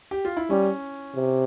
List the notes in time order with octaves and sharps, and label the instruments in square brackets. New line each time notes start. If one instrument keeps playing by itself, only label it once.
[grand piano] G4
F4
E4
[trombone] G3 [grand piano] C#4
[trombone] C3